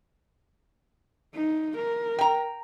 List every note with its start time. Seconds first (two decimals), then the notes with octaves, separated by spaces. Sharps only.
1.34 D#4
1.78 A#4
2.19 G5 A#5